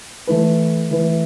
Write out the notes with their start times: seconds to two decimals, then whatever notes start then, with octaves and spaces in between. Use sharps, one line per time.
0.27 E3 A3 E4 B4
0.91 E3 A3 E4 B4